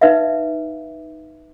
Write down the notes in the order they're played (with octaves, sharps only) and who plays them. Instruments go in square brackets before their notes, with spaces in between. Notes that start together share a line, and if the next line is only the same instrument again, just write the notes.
[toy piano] D#4 B4 E5 F5